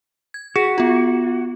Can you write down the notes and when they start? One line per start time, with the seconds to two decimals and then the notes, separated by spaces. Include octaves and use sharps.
0.34 G#6
0.56 F#4 G#4
0.78 B3 F4